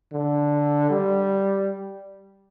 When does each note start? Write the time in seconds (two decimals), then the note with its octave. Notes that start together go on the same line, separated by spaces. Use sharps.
0.13 D3
0.90 G3